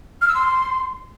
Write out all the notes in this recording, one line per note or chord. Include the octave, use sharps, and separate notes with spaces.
F6
E6
C6